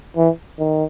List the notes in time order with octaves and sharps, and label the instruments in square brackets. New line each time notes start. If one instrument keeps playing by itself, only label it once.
[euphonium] E3
D#3